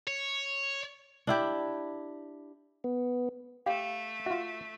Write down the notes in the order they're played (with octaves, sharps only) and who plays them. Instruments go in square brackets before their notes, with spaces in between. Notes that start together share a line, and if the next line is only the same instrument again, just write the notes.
[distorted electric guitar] C#5
[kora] D4 E4 G4
[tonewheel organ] B3
[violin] A3 [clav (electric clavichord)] G4 [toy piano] F5
[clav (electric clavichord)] F4 F#4 [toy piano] E5